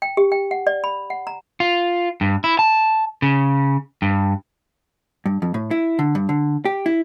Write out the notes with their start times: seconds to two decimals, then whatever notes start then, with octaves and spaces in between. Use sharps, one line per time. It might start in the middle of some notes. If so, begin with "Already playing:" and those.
0.02 G5
0.17 G4
0.32 G5
0.51 F#5
0.67 D5
0.84 B5
1.10 F#5
1.27 A#5
1.60 F4
2.21 G2
2.44 E4
2.59 A5
3.22 C#3
4.02 G2
5.26 G2
5.42 F2
5.54 A2
5.71 E4
5.99 D3
6.15 G2
6.29 D3
6.65 G4
6.86 E4